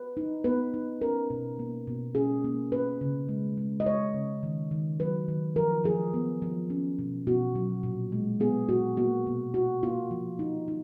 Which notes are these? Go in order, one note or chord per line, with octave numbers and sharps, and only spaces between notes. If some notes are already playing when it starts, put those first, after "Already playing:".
Already playing: B4
D#4
B3 B4
D#4
C#4 A#4
B2
A#3
B2
C#4 G#4
A#3
C#4 B4
C#3
G#3
G#3
D#5
G#3 C#5
C#3
D#3
D#3
F#3 B4
D#3
F3 A#4
F3 G#4
B3
F3
C#4
B2
B2 F#4
F#3
A#2
G#3
B3 G#4
A#2 F#4
A#3 F#4
B2
A#3 F#4
A#3 F4
F3
D#4
D#4